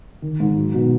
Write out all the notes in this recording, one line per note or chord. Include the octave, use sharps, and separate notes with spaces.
D#3
G#2
F#3
B2